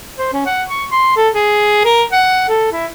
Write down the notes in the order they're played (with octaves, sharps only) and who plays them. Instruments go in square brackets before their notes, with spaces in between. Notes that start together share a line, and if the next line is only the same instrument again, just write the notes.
[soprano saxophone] C5
C#4
F#5
C#6
C6
A4
G#4
A#4
F#5
A4
E4